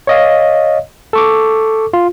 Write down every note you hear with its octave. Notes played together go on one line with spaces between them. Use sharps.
C#5 D#5 F5
A4 C#6 D6
F4